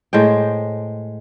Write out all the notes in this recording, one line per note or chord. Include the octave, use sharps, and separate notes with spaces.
A2 G#3 C5 G5